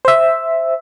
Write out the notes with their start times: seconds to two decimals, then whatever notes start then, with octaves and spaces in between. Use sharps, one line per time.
0.05 C5 E5